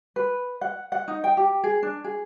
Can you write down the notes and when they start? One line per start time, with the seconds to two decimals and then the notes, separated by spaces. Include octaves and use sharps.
0.16 B4
0.61 F#5
0.92 F#5
1.08 D#4
1.24 G5
1.37 G4
1.64 G#4
1.83 D4
2.04 G#4